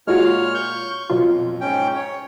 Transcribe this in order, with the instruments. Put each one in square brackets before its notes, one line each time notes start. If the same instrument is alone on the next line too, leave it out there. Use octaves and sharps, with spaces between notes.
[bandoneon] A#2 C#5 F6 [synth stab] G#3 F4 F#4
[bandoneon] C#6 G6
[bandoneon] F2 [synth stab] B2 F#3 F4
[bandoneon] G#2 C#4 G5
C#5